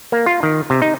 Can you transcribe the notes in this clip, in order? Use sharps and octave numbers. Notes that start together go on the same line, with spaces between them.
A#3
F4
D#3
C3
D#4